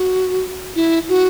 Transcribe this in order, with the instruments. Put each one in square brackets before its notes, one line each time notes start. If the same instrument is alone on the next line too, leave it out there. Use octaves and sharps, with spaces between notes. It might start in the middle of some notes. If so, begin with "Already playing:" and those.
Already playing: [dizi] F#4
E4
F#4